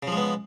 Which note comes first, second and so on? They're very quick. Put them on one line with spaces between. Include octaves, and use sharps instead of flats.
C#3 F3 G#3 B3